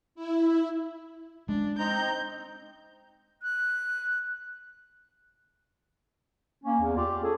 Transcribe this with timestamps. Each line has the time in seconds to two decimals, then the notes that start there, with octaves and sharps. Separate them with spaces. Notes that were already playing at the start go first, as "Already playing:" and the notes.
0.15 E4
1.49 G#3 C#4 D4
1.78 C4 D#4 A#5 G6
3.42 F#6
6.64 A#3 C#4
6.80 E2
6.96 F4 G4 D5
7.24 C#4 G#4 A4